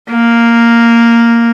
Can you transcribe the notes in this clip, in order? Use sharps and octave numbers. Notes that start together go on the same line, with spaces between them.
A#3